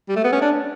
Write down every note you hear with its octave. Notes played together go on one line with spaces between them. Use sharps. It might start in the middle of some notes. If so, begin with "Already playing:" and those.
G3
A3
B3
C#4
D4